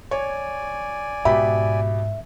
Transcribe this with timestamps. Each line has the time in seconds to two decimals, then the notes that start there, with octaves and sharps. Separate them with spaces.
0.11 C#5 D5 G#5
1.25 G#2 B2 G4 E5 B5